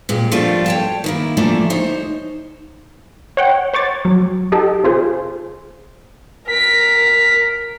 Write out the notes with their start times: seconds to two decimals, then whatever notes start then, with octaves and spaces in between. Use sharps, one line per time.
0.09 A#2 G#3 G4
0.32 F3 G3 A3 A#3 D4 F4
0.66 C#5 G5 A5
1.04 D#3 A#3 E4
1.37 D3 E3 F3 A3 A#3 D4
1.70 D#4 C5 C#5
3.37 C#5 F#5 G5
3.74 C5 C#5 D6 A6
4.05 F#3
4.52 D#4 G4 A4
4.84 C3 F4 G#4 C5
6.48 A#4 B6